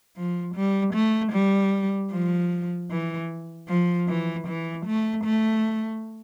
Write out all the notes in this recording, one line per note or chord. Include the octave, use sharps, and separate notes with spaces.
F3
G3
A3
G3
F3
E3
F3
E3
E3
A3
A3